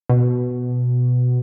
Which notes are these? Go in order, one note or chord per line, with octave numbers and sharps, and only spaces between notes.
B2